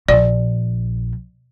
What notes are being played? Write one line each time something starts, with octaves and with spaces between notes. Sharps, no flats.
A#1 D5